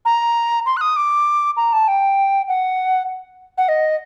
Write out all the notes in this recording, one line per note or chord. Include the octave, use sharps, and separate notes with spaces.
A#5
C6
F#6
D#6
D6
A#5
A5
G5
F#5
F#5
D#5